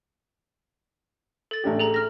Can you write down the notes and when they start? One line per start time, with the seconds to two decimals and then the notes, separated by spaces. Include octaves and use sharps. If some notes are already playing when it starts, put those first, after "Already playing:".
1.51 A4 A6
1.64 A1 D4 G4
1.79 G#4 A4 A#5
1.94 F6 A#6